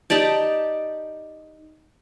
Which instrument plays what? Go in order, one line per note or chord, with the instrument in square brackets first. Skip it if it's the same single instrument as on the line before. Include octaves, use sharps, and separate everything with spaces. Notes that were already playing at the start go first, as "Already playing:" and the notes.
[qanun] D#4 G4 D5 A5